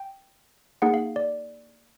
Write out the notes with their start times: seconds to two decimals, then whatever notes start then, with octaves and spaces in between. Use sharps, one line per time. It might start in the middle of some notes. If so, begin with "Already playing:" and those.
Already playing: G5
0.82 A#3 D#4 G#4 F#5
0.94 F5
1.16 D5